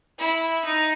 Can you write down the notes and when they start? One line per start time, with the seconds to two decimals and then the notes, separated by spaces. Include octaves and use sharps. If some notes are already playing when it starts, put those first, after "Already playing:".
0.19 E4
0.65 D#4